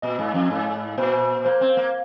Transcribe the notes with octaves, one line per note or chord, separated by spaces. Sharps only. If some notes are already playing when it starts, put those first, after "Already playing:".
A#2 D#5
G#2
F2
G#2
A#2 C5
A#3 C5
C4
A#3